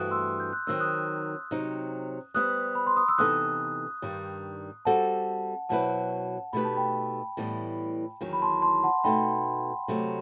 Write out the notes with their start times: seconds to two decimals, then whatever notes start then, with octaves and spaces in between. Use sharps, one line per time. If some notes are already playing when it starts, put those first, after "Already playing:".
Already playing: G2 E3 A3 C4 F#4 D#6 F#6
0.11 C6 E6
0.40 G6
0.53 F#6
0.67 D#3 F#3 C4 D#4 E6
0.80 D#6 F#6
1.51 C3 F#3 C4 D#4
2.34 G3 B3 E4 G4 C5 D#6 F#6
2.75 B5
2.87 C6
2.97 D#6
3.08 E6
3.18 C3 E3 B3 D#4 A4 D#6 F#6
4.02 G2 D#3 G3
4.85 G3 C4 F#4 A4 F#5 A5
5.69 B2 F#3 C4 E4 B4 F#5 A5
6.53 B2 A3 D#4 G4 B4 B5
6.65 A5
6.77 G5 B5
7.37 A2 E3 G3 B3
8.21 E2 D#3 F#3
8.33 B5
8.42 A5 C6
8.62 A5 C6
8.83 F#5 A5
9.04 B2 A3 D#4 G5 B5
9.88 C3 F#3 A3